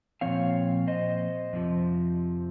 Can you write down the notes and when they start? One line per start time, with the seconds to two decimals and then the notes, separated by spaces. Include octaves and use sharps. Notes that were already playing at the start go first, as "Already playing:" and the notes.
0.21 A#2 F3 C4 C#5 F5
0.87 C5 D#5
1.53 F2 C3 F3